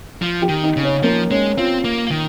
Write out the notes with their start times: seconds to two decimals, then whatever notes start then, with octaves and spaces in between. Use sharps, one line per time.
0.22 F3
0.42 G4
0.49 D#3
0.63 D#4
0.77 C#3
0.83 C#4
1.03 F3 A#3
1.30 G#3 C#4
1.57 C4 F4
1.84 A#3
2.11 D#3